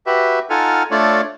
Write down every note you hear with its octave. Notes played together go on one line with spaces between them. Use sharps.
F#4 G4 B4 E5
D#4 F4 A4 F#5 G#5 F6
A3 D4 F4 A4 C#5 D5